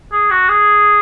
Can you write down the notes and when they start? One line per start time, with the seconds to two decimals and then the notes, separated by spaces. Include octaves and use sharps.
0.12 G#4
0.31 F#4
0.49 G#4